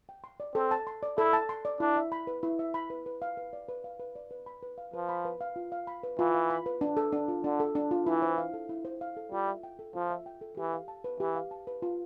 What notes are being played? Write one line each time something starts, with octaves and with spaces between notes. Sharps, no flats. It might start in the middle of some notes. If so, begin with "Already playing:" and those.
G5
C6
D5
C4 A4
A5
C6
D5
E4 A4
A5
C6
D5
D4 E4
E5
B5
B4
E4
E5
B5
B4
B4
F5
B4
D5
B4
F5
B4
D5
B4
B5
B4
F5
F3 B4
B5
B4
F5
F4
F5
B5
B4
E3 F4
F5
B5
B4
D4
A4
D4
F4
D3 D4
A4
D4
F4
E3 E4
C5
F5
A4
E4
C5
F5
A4
G3 F4
E5
G5
A4
F3 F4
E5
G5
A4
E3 G4
F5
A5
B4
E3 G4
F5
A5
B4
F4